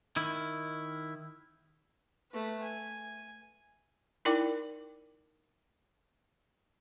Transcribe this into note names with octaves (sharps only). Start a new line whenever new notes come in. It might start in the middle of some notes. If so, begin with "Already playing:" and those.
D#3 E4
A3 B4
G#5
D#4 E4 A#4 D5 G5 D6